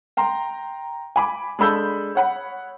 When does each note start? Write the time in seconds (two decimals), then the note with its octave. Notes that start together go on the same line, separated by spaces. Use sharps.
0.17 G5 A#5 C6
1.16 G#5 B5 D6
1.59 G#3 D4 A4 B5 E6 G6
2.15 C#5 F#5 B5